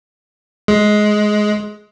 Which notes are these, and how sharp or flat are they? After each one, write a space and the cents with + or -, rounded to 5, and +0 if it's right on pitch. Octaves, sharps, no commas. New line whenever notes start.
G#3 +15